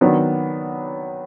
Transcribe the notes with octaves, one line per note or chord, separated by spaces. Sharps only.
D#3 F#3 B3 D4